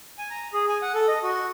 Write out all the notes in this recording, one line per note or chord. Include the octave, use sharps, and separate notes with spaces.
G#5
A#5
G#4
G#5
F#5
A4
D#5
F#4